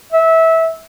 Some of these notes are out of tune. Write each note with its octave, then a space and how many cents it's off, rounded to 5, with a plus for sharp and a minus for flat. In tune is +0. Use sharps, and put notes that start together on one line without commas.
E5 -20